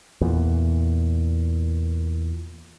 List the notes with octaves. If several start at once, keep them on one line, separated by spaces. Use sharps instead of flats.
E2 A#2